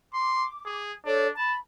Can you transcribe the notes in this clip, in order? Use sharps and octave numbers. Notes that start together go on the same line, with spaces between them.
C6 D6
G#4
D4 A4 C#5
A5 B5